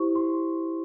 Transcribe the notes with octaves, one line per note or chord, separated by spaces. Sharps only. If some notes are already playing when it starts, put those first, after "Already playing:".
Already playing: E4 G4 C5 C#6
C6